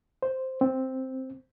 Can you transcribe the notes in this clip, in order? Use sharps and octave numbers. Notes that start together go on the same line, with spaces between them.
C5
C4